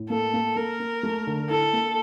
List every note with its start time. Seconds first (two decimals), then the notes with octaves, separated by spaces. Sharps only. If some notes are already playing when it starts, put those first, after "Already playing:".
Already playing: A2
0.10 A#3 A4
0.34 A#3
0.56 A#3 A#4
0.80 A#3
1.03 A3
1.27 D3
1.50 E4 A4
1.73 A#3